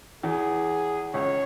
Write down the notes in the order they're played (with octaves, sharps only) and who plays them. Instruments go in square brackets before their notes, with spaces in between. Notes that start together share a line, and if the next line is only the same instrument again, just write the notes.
[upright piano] E2 E3 [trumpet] G#4
[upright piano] C#2 C#3 [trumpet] C#5